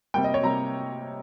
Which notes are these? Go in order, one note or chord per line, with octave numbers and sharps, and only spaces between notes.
C3 G3 A#3 G5
D#5
C#5
C3 G3 A#3 A#5